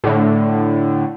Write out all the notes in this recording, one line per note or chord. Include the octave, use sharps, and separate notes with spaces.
A2 D3